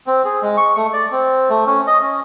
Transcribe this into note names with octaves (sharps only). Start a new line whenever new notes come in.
C4
G#4
G#3
C#6
A3
D5
C4
A3
C#4
D#5
C#4